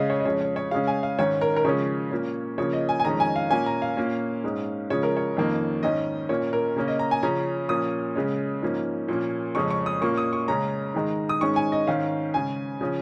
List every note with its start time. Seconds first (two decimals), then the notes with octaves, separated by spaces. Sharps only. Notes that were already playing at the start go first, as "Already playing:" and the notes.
Already playing: C#3 G#3 C#4 D#5 F5
0.10 C#5
0.20 D#5
0.25 F2 C#3 G#3 C#4 C#5
0.41 C#5
0.56 C#5
0.71 C#3 G#3 C#4 F5
0.87 G#5
1.03 F5
1.18 G#2 D#3 C#4 C#5
1.41 A#4
1.56 A#4
1.64 C#3 F3 G#3 C#4 C#5
2.12 A#2 A#3 C#4
2.58 C#3 F3 A#3 C#4 C#5
2.73 D#5
2.89 G#5
3.00 G#5
3.04 F2 D#3 G#3 C#4 A#5
3.20 G#5
3.36 F5
3.50 A#2 A#3 C#4 G#5
3.66 A#5
3.82 F5
3.97 A#2 A#3 C#4
4.44 G#2 G#3 C#4
4.90 C#3 F3 G#3 C#4 C#5
5.03 A#4
5.17 C#5
5.37 F2 D#3 A#3 C#4
5.83 G#2 D#3 C#4 D#5
6.29 A#2 A#3 C#4 C#5
6.53 A#4
6.76 C#3 A#3 C#4
6.88 D#5
6.99 A#5
7.11 G#5
7.23 C#3 F3 C#4 A#5
7.69 A#2 F3 A#3 C#4 D#6
8.16 C#3 G#3 C#4
8.62 G#2 F3 A#3 C#4
9.08 A#2 F3 A#3 C#4
9.55 F2 C#3 G#3 C#4 C#6
9.70 C#6
9.86 D#6
10.01 A#2 A#3 C#4 C#6
10.17 D#6
10.33 C#6
10.48 C#3 G#3 C#4 A#5
10.94 G#2 D#3 G#3
11.29 D#6
11.41 G#2 D#3 G#3 C#4 C#6
11.56 G#5
11.72 D#5
11.87 G#2 D#3 C#4 F5
12.34 C#3 G#3 C#4 G#5
12.81 C#3 F3 C#4